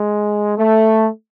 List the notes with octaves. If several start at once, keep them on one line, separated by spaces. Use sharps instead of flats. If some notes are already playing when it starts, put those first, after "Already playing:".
Already playing: G#3
A3